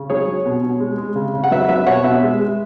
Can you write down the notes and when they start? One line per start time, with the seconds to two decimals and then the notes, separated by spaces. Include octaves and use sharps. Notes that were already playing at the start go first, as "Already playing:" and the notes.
Already playing: C#3
0.10 F#3 G#4 C#5
0.28 F#3
0.45 B2
0.63 B2
0.80 G#3
0.98 G#3
1.16 C#3
1.34 C#3
1.44 F#5
1.51 F#3 B4 E5
1.69 F#3 B4 E5
1.86 B2 C#5 F#5
2.04 B2 B4 E5
2.23 G#3
2.40 G#3